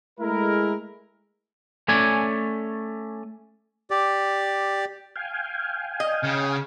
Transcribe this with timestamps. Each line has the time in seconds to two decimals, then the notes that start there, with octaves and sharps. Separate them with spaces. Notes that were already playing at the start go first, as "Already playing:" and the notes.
0.20 G#3 A3 E4 A#4
1.88 A3 C#4 D5 G#5
3.91 G4 D5
5.16 F5 G5 G#5
6.00 D#5
6.23 C#3